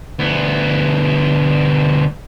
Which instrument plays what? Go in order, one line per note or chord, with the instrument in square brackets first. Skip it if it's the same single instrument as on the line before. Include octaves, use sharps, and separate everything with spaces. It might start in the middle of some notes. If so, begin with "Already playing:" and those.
[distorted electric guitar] D2 B3